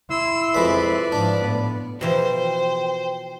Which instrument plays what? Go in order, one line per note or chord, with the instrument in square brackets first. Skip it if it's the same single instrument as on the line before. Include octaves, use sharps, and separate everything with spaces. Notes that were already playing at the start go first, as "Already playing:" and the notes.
[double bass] E4 [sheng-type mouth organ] C6 E6
[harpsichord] F2 G#3 B5 [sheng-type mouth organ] B4 D5
[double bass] G#2 F3 [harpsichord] D4
[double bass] A2 B3
[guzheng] B2 E3 F3 [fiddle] C5 [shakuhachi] G5